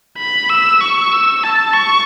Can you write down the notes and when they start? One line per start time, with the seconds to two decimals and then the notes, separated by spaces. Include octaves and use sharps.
0.18 B5
0.50 E6
0.81 C#6
1.12 E6
1.43 A5
1.74 C#6